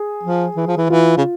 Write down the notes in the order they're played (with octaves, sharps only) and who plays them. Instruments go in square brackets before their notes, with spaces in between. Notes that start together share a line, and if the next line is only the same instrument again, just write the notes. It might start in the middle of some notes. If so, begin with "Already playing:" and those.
Already playing: [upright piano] G#4
[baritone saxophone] F3
E3
F3
E3
[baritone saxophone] E3 [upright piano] F4
[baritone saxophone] C#3